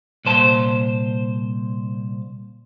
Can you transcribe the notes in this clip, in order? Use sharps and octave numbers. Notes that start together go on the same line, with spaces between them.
C2 A#2 C5 A5